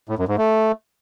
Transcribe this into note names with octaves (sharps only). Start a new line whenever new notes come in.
A2
F#2
G#2
A3